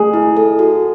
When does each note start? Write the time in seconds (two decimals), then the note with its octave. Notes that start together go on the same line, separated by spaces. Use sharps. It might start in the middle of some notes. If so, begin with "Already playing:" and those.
Already playing: A3 G#4
0.14 E4
0.37 A4
0.59 F#4